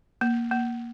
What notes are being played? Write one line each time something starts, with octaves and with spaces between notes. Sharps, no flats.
A#3
A#3